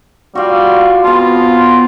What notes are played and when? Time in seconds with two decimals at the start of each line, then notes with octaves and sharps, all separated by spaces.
0.35 G3 F4 F#4
1.04 B3 C4 F4 A5